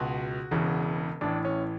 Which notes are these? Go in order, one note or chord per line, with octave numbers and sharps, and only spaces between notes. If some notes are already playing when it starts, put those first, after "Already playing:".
Already playing: C#2 B2 F#4
E1 E2 C#3
A1 A2 E3 D4
C#4